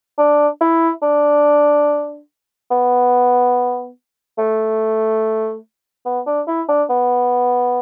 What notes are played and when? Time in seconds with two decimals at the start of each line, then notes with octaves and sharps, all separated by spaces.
0.18 D4
0.61 E4
1.02 D4
2.71 B3
4.38 A3
6.05 B3
6.26 D4
6.47 E4
6.69 D4
6.90 B3